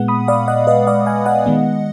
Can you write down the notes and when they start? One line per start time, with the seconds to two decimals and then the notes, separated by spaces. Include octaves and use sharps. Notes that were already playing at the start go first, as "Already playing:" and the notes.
Already playing: A#2 G#3 B3 F#5
0.08 B5 D#6
0.28 D5 F5
0.48 D#5 F#5
0.67 B4 D#5
0.87 D5 F5
1.06 F5 G#5
1.26 D#5 F#5
1.46 D#3 G#3 B3